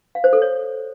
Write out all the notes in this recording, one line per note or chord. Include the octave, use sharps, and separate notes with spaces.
F5
C5
A4
C#5